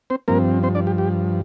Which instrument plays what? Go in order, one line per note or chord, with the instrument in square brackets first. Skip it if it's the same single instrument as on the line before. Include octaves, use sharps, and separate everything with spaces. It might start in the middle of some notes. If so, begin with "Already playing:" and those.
[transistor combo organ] C4 C5
G2 F3 A#3 C4 A#4
C4 C5
D4 D5
G4
G4